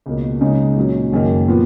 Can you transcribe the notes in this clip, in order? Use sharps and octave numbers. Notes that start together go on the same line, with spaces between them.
C#2 B2 A#3
C#2 C#3 G#3 D#4
A#2 F#3 C#4
F#1 F#2 D#3 A#3
A#2 F3 B3